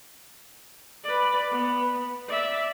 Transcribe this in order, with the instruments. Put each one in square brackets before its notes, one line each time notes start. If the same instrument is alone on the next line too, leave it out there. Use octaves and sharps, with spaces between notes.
[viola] B4 D5
B3
D5 E5